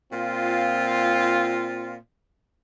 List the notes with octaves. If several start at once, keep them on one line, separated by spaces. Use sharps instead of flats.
A#2 C4 F4